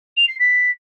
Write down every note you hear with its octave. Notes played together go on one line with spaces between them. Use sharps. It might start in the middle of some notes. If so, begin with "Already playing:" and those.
F7
C7
B6